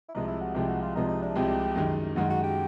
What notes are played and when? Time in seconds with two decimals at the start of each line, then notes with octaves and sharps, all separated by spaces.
0.09 E4
0.15 C2 C3 F3 G#3 D#4
0.28 E4
0.41 F#4
0.54 C2 C3 F3 G#3 G4
0.68 F#4
0.82 F4
0.95 C2 C3 F3 G#3 D#4
1.08 D#4
1.22 D4
1.35 C2 C3 F3 G#3 G4
1.76 F#2 D#3 G#3
2.16 F#2 D#3 G#3 F#4
2.30 F#4
2.43 G4